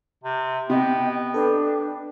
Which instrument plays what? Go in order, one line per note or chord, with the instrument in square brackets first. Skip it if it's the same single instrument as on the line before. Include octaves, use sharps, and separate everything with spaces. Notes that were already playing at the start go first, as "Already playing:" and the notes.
[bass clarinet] C3
[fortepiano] C3 [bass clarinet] B3 [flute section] D#5 G5
[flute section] D4 [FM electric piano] A4 B4 G5